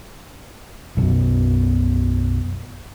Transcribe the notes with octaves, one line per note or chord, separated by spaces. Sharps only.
B1 F#2 B2 F#3